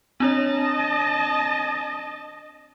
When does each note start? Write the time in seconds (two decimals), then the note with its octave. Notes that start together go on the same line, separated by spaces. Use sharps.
0.20 C4 D4 C#5 D#5 A5